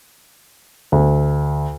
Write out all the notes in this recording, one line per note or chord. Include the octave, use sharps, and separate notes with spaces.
D2